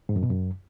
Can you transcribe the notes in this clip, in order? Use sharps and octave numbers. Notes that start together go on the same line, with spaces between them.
G#2
F#2
B2
F#2